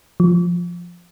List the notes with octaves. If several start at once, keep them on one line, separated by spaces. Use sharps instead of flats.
F3